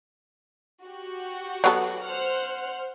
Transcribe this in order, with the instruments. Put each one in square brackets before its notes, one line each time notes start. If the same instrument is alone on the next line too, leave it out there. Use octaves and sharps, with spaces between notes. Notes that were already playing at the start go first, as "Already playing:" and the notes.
[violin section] F#4 G4
[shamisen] F#3 B3 A4
[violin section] C5 F#5 F6